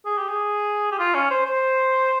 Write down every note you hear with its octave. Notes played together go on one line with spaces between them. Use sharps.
G#4
G4
G#4
G4
F4
C#4
C5
C5